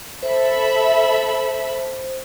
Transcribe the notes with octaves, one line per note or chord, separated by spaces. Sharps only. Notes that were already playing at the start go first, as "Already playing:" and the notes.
A4 C5 E5 B5